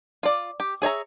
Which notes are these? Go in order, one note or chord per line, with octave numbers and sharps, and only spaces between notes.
F4 D5
G4
G#4 C#5 E5 A#5